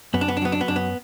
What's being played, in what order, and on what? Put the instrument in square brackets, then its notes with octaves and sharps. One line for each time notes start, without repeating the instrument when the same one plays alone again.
[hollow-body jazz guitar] F#2 B3
D4
B3
D4
F#3 B3
D4
B3
F#2 D4
B3